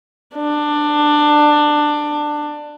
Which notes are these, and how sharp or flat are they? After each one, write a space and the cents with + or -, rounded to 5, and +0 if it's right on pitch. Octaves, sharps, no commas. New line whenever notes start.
D4 +15